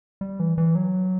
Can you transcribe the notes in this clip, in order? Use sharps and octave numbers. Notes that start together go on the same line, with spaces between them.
G3
E3
E3
F#3